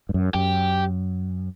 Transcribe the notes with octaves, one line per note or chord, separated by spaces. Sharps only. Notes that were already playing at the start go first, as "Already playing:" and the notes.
G2
F#2
F#2 G4